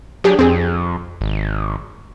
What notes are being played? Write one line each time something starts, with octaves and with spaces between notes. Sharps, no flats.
F#3 D4 G4 G#4
F2 C4 G#4
G#1